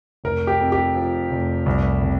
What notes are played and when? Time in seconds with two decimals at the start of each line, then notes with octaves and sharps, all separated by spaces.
0.24 F1 A#4
0.47 G4
0.60 F2
0.72 G4
0.96 F3
1.31 F1
1.66 C2
2.02 C3